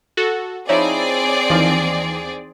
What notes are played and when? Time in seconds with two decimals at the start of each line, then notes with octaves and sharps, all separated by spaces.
0.17 F#4 A4
0.69 F3 C4 D#4 E4 G#4 C#5 D5
1.50 D#2 E3 F3 D#4